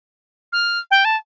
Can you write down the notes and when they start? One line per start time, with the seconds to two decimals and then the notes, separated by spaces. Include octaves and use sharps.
0.53 F6
0.91 G5
1.05 A5